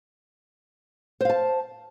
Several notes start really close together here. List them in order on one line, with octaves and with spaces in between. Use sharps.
C5 F5 A5